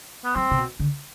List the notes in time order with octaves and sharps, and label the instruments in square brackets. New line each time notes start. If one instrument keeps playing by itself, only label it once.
[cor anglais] B3
[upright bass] F#3 [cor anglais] C4
[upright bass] C3
B2
D3